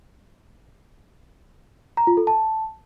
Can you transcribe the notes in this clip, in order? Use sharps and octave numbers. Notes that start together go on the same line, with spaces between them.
A#5
F4
A4
A5